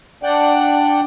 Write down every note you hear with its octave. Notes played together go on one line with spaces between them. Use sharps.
D4 D5 F#5 G5